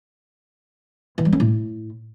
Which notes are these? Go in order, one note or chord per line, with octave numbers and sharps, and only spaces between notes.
E3
G3
C#4
A2